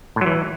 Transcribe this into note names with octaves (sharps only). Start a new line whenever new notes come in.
A2
F#3
E3